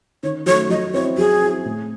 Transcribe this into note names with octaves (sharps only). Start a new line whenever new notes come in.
D#3 C#5
F#3 A3 C#5
F#3 D#5
C4 E4 C#5
F#3 G#4
C4 E4
A2